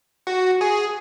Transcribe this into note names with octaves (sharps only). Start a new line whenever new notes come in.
F#4
G#4